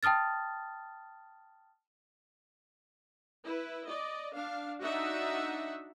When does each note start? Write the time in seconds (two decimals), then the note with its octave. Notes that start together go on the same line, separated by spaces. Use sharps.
0.03 G5 A5 D#6 F6 A6
3.45 E4 B4
3.87 D5 D#5
4.33 D4 F5
4.82 D4 D#4 F#4 E5 F#5